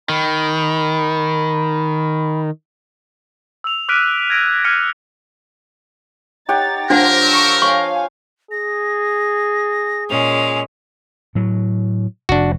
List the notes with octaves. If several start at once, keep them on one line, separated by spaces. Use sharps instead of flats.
D#3 B5
E6 F7
D6 F6 F#6 B6 D7 D#7
G#6 A#6 D7 D#7
F6 F#6 G#6 C#7 D#7
D#4 G4 C#5 F#5 A6
F3 D4 G4 A#4 C5 F#5 A#6
C#6 E6
C#5 F5 G#5 C#6
G#4 A#6
A#2 G#3 C#4 F7
A2 F#3
F1 D4 F#4